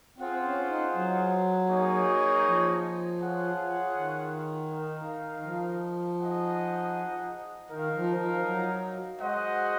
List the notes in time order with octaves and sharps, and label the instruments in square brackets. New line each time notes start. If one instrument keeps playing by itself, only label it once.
[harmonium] C4 [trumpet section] F4 G#4 C5 F#5
[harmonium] C#4
D#4
F#3
[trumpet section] A#3 D#4 G#4 C#5
[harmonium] F3
[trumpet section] F4 G#4 C#5 F#5
[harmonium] D#3
[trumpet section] D#4 A#4 F5
[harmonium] D#3
F3
[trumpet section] D#4 G#4 D#5 F#5
[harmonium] D#3 [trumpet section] D#4 A#4 F5
[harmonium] F3
F3
F#3
[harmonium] G#3 [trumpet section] F#4 C5 D#5 F#5